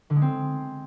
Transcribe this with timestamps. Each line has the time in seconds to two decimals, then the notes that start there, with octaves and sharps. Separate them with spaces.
0.10 D3
0.16 G#3
0.22 C4